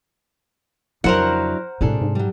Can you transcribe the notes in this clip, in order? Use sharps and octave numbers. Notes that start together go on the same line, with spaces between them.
F2 C#3 F#3 D4 E4 A#4 C5 F#5
A2 C3 G#3 D4 G#4 A4
G#2
F#3 G3